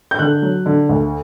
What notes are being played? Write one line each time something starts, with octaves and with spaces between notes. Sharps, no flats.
G6
D3 F#6
F#3
D3
D2